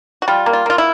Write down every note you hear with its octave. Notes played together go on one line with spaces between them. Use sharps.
F#4
G3 F4
A#3
F4
A#3 F4
E4